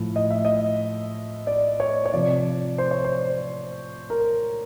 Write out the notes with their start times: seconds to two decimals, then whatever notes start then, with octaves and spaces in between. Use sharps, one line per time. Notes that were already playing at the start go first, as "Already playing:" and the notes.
Already playing: A2 F3
0.16 D#5
0.31 E5
0.45 D#5
1.47 D5
1.80 C#5
2.06 C#5
2.13 C3 F3 D5
2.78 C5
2.91 C#5
3.04 C5
4.10 A#4